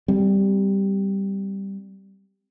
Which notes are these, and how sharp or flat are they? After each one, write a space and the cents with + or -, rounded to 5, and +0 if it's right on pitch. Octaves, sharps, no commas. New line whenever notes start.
G3 +0 C4 -20